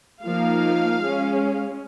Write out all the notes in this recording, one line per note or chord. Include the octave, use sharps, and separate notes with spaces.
F3 A#3 D#4 F5
G#3 C#4